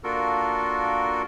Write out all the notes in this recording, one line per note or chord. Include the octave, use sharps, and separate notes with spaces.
A#3 D4 F4 F#4 A4 A#4